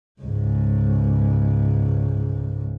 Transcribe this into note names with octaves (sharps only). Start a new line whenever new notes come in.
C#2 G#2